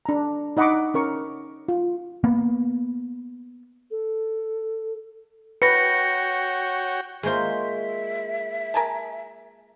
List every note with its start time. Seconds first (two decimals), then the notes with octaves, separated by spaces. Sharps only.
0.05 D4 A#5
0.57 D#4 D#5 F#5 B5 C#6 D6
0.94 C#4 A#4 C#6
1.69 F4
2.24 A#3 B3
3.91 A4
5.62 F#4 B4 C#5 G5 A#6 C#7
7.23 G#3 A#3 C#4 F4 C5 E5
8.74 A#4 G#5 A5